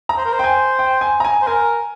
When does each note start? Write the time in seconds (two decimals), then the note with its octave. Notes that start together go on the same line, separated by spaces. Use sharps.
0.09 A#5
0.17 C5
0.25 A#4
0.33 C5
0.39 G5
0.44 G#5
0.79 G5
1.01 G#5
1.20 A#5
1.25 G#5
1.42 C5
1.47 A#4 G#5